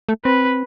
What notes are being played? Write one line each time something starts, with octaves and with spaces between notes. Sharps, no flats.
A3
C4 B4